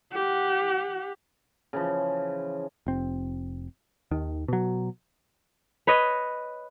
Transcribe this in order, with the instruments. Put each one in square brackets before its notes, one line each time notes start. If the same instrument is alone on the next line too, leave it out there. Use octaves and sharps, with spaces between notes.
[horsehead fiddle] G4 F#5
[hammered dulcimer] C#3 E3 F3
[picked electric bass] F1 C4
D#2 D#3
B2 F#3
[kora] B4 C#5 D#5